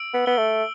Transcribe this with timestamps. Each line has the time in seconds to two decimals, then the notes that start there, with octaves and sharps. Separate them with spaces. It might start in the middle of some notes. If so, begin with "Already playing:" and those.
Already playing: E6 D7
0.14 B3
0.26 B3 G7
0.38 A3